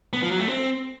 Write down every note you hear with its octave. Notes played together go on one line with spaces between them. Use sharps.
B3
F3
F#3
A3
C4